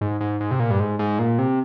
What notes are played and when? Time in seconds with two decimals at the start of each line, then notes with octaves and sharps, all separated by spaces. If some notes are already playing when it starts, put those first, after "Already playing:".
0.01 G#2
0.21 G#2
0.40 G#2
0.51 C3
0.60 A#2
0.70 G2
0.80 G#2
0.99 G#2
1.19 A#2
1.39 C3